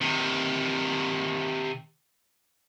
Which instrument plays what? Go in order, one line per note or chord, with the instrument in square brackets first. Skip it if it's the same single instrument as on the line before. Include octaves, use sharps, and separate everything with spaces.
[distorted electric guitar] C3 D#3